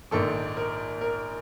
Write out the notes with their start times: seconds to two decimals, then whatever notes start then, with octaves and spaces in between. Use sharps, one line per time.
0.11 A#1 G#2 D#3 A4
0.57 A#4
1.01 A#4